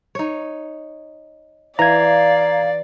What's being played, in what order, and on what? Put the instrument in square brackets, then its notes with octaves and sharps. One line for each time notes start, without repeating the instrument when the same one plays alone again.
[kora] D#4 C#5
[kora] E3 [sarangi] D5 [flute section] F5 [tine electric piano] A#5 G#6